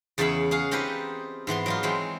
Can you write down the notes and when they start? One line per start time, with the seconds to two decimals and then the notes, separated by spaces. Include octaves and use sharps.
0.18 E2 C#3 G#4 C#5 E5 B5
0.51 G#4 C#5 F5 F#5
0.71 C4 D#4 F4 G4 B4
1.47 G#2 E3 B3 C6
1.66 F#3 D#4 F4
1.83 E3 G#3 C4